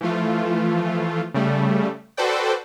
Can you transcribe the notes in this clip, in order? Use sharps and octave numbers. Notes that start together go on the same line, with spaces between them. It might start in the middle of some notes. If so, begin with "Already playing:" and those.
E3 F3 A3 F4
C#3 G3 A3
F#4 A4 B4 C5 D5 G5